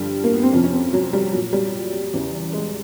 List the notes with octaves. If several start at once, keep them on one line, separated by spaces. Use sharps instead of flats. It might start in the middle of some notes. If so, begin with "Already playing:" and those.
Already playing: G2 D3 F3 G3
A#3
B3
C4
F2 C3 F3 C#4
C#4
C4
F#3
G3
A#2 F#3
G3
E2 C#3 E3
G#3